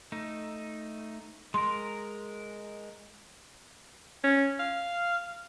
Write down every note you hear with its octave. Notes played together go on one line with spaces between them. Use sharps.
A3 D#4
G#3 A#4 C6
C#4
F5